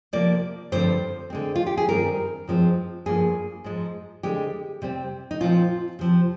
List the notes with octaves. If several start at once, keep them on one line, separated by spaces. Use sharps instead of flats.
C3 F3 A#3 D5
G2 D3 F3 C4 C5
D3 G#3 C4
F4
G4
G#4
G2 D#3 G3 C4 A#4
G2 F3 G#3 C4
G2 F3 A#3 G#4
G#2 F3 G#3
D3 G#3 C4 G4
C3 G3 C4
D#4
A#2 F3 C4 F4
C3 F3 C4